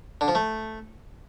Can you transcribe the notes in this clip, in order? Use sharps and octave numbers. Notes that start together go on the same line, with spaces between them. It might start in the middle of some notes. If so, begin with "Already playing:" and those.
D3
F3
A3